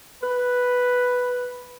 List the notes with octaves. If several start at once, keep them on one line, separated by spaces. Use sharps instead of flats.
B4